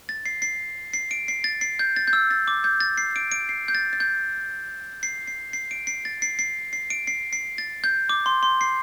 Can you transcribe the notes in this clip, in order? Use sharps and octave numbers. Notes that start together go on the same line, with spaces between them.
A6
C7
C7
C7
D7
C7
A6
C7
G6
A6
G6
E6
A6
D6
G6
A6
C7
D7
D7
C7
G6
A6
A6
G6
C7
C7
C7
D7
C7
A6
C7
C7
C7
D7
C7
C7
A6
G6
D6
C6
C6
C7